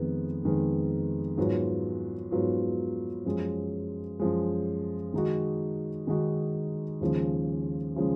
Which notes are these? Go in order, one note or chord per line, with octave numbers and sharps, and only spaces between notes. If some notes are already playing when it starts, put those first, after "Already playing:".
Already playing: F2 D#3 G#3 B3
F2 D#3 G#3 B3
G#2 F#3 B3 F4
G#2 F#3 B3 F4
F#2 F3 G#3
F#2 F3 G#3
D#3 G#3 D#4 F#4
D#3 G#3 D#4 F#4
D#2 C#3 F3 G#3
C#3 F3 G#3